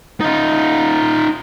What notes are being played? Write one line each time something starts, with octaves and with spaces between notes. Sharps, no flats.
D#4 F4